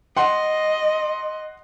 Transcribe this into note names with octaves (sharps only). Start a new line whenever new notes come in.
D#5 F#5 C6